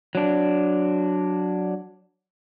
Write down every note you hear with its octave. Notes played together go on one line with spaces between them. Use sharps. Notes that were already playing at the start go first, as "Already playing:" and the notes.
F#3 D4